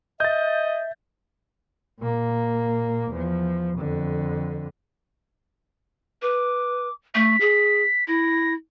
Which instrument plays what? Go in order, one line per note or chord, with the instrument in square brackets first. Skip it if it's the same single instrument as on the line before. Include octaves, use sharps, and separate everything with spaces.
[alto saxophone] D#5 [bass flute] E5 [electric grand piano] G6 A6
[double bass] A#2 A#3
E2 F3
F2 D3
[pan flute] B4 [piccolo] D6
[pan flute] A3 [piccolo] B6
[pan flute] G#4
[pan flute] E4 [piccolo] A#6